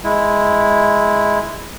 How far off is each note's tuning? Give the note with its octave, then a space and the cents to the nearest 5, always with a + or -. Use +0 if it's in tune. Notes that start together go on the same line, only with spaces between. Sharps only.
G#3 +0 E4 -5